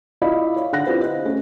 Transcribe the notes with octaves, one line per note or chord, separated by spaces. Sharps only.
E4 F4 D5 D#5 F5 B5
C#5
D3 F#5 F#6 A#6
C4 E4 F4 G4 B4 C5
D#5
A3 C#4